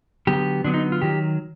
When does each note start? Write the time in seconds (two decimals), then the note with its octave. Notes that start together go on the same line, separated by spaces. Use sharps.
0.27 D3 F#3 B3 G4
0.64 D3 F#3 B3 D4
0.74 D#4
0.92 F4
1.02 D#3 F#3 G4